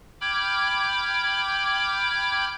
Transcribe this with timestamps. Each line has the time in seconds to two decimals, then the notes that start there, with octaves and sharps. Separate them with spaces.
0.21 G5 B5 D6 F6 G6 G#6